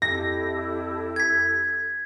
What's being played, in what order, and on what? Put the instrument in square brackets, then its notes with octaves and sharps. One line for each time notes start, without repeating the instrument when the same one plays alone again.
[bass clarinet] F2 [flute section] E4 G4 A4 [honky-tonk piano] A#6
[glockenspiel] G#6 B6